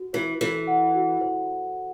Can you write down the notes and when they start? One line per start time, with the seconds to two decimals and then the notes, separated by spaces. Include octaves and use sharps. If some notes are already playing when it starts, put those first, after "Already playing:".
Already playing: F#4
0.13 E3 C5
0.40 E3 A4
0.67 F#5
0.95 F#4
1.21 C5